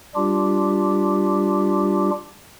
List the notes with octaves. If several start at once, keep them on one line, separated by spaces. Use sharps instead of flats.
G3 D4 F4 G4